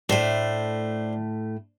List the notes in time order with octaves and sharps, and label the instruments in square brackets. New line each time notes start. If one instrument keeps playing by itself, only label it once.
[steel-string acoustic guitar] A2 A3 [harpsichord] D4 C5